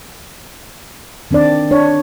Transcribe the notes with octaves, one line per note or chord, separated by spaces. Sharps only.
D#3 C4 D4 D5
D4 C#5